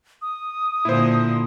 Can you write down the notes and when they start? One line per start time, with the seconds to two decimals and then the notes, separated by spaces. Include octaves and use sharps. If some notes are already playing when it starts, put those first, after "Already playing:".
0.22 D#6
0.85 A#2 D3 E4 C5